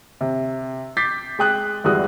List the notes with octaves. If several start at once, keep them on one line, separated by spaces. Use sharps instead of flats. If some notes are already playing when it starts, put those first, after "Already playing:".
C3
D6 G6 A6 B6 C7
G#3 G5 D#6 F#6
E2 G3 G#3 F#4 D#6 F#6